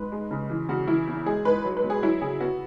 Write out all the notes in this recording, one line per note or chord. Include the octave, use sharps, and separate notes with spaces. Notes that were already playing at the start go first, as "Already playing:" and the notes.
Already playing: G#2 B4
G#3
C#3
E3
C#3 F#4
E3 E4
E2
G#3 G#4
G#2 B4
F#3
B4
B2
G#4
F#3 E4
C#3 G#4
B3 F#4